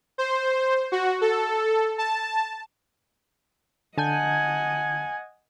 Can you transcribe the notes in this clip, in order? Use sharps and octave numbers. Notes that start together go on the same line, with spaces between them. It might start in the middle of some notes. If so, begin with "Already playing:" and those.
C5
F#4
A4
A5
D3 D#5 F#5 G#5 A5 G6